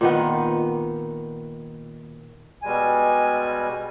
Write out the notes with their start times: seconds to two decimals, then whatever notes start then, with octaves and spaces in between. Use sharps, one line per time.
0.01 A#2 D#3 B3
2.62 B2 G3 G#3 G#5